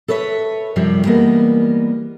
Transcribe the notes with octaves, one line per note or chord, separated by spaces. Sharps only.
A4 B4 C#5 D5 E5
F#2 C3 F3 G3
E3 G3 G#3 A#3 B3